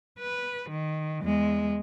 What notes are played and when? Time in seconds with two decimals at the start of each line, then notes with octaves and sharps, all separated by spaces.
0.19 B4
0.69 D#3
1.22 E2 G#3